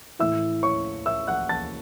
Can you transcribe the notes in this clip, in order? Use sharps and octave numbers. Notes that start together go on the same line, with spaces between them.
A2 E3 E5 E6
C#5 C#6
E5 E6
F#5 F#6
A5 A6